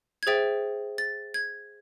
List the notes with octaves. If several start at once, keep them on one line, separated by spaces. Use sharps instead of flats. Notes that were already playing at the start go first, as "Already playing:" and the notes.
G#6
G#4 C5 E5 G5 A6
A6
G#6